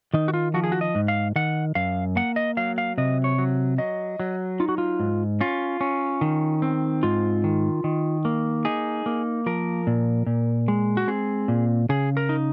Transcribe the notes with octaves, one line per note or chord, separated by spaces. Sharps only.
D#3 D#4
F#4
F4
F3 F#4
G#4
F#4
D#5
G#2
F5
D#3 F#5
F#2 F5
A#3 F#5
D#5
F#3 F5
F5
C3 D#5
C#5
F#3
F#3 D#5
F#3
D#4 F4
F#4
F4
G#2
C#4 F4
C#4
D#3
C4
G#2 F4
D#3
D#3
A#3
D#4 G#4
A#3
F3 A#4
A#2
A#2
G#3
F#4
C4 G#4
A#2
C#3 G#4
A#4
D#4